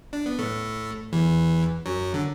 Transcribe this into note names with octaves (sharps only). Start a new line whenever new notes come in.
D4
B3
A2 A3
E2 E3
F#2 F#3
D3